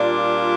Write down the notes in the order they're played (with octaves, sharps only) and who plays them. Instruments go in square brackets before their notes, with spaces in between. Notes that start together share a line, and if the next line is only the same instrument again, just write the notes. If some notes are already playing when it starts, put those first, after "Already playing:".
Already playing: [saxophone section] A#2 G3 D4 F4 [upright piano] D5